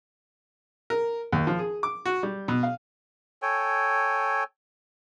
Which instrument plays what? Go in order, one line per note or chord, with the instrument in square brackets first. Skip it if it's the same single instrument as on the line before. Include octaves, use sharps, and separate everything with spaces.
[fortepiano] A#4
D#2
F3
G#4
D6
F#4
G3
B2
F5
[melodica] A4 C#5 G5 G#5